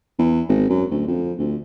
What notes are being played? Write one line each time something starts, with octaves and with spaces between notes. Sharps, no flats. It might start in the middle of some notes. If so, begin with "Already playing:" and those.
E2
G#1
F#2
D2
F2
D2